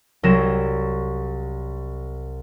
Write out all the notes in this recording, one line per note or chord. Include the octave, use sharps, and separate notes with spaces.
C2 F#3 A#6 E7